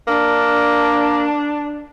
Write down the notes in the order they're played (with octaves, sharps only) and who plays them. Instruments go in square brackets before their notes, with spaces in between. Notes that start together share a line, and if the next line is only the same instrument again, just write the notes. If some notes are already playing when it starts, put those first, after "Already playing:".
[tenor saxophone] A#3 [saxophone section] D4